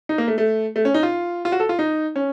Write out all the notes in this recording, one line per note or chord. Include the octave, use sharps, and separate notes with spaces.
D#4
A#3
A3
A3
A3
C#4
D#4
F4
F4
F#4
A4
F4
D#4
C#4